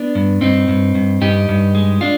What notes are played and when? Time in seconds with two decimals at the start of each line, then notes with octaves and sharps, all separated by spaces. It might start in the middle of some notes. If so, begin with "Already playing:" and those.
Already playing: B3 D4
0.15 G2
0.41 G2 C4 D#4
0.68 G2
0.95 G2
1.21 G2 D#4 G4
1.49 G2
1.75 G#3
2.01 D4 F4